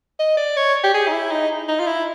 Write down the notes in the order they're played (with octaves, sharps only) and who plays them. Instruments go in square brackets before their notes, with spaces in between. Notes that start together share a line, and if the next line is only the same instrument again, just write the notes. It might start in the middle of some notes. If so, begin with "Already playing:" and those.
[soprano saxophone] D#5
D5
C#5
G4
G#4
D#4
E4
D#4
D#4
F4
E4